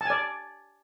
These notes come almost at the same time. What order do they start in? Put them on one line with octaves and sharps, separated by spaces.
A5 G#5 D5